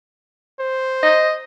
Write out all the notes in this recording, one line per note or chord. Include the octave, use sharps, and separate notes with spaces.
C5
D#5